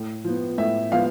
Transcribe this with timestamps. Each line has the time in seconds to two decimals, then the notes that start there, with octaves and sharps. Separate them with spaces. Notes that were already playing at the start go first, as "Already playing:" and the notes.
Already playing: A2
0.24 F3 B3
0.58 A2 E5
0.92 F3 B3 F5